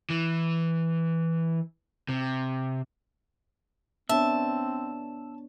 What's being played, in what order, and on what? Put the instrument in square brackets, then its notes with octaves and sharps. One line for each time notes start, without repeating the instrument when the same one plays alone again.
[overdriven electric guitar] E3
C3
[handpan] B3 D4 C#5 [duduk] C4 [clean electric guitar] E5 [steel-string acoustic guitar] A5